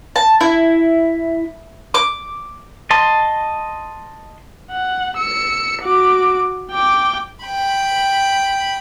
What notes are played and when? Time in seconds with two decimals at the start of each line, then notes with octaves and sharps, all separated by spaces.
0.16 A5
0.41 E4
1.94 D6
2.91 D#5 A5 C6
4.72 F#5
5.17 E6 C#7
5.82 F#4 D6
6.71 G5 D6
7.45 G5 B5